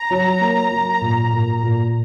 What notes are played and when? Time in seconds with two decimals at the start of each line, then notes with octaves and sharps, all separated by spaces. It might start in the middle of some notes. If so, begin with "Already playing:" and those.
Already playing: A#5
0.10 F#3
0.41 A#3
0.71 F#3
1.01 A#2
1.33 A#2
1.63 A#2